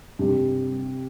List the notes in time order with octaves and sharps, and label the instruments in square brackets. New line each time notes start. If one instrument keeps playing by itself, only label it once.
[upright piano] G2 G3 D4 [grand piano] C3